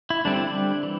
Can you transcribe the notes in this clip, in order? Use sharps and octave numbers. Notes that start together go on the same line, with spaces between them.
E4
D3 G3 C4 D4
E4
D4
E3